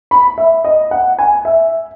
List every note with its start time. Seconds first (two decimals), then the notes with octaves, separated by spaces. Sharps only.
0.11 B5
0.38 E5
0.64 D#5
0.91 F#5
1.19 G#5
1.45 E5